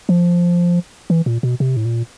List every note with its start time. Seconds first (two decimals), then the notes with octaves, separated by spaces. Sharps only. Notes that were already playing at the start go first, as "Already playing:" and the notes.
0.09 F3
1.10 E3
1.26 A#2
1.43 B2
1.60 C3
1.76 A2
1.85 A#2